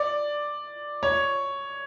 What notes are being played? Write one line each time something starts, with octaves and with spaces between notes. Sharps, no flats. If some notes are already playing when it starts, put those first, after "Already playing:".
Already playing: D5
C#5